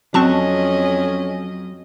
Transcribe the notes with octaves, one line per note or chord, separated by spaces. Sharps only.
F2 F#3 C4 C#4 D#5 A5 C#6